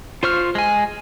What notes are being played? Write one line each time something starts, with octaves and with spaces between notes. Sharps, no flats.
F4 C5 C#6 F6
G#3 G#5